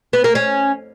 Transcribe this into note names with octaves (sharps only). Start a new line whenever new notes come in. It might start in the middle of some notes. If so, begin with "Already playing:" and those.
B3
A#3
C#4